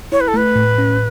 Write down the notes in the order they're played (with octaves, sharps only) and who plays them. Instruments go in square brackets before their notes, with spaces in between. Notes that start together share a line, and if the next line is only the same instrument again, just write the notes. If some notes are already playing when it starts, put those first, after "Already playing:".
[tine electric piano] E4 [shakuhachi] C#5
[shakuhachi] B4
A4
[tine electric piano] A3 [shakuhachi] B4
[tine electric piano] A2
C#4